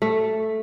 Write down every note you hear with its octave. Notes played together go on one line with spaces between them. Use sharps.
A3